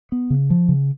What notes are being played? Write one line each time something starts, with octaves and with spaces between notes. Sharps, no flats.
B3
C#3
F3
C#3